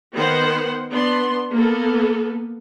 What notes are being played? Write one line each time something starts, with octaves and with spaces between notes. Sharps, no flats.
D#3 B3 C5 F#5
B3 D4 C6
A#3 B3 A4